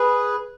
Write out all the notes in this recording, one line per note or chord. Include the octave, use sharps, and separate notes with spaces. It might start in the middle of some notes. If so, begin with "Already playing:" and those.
Already playing: G#4 B4